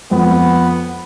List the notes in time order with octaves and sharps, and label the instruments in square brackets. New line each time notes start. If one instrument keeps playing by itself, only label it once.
[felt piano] F2 [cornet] B3